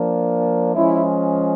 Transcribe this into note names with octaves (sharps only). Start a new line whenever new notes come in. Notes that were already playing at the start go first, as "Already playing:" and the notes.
Already playing: F3 A#3 D4
F3 G#3 C#4 E4